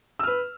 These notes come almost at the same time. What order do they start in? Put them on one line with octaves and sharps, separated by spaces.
E6 F6 B4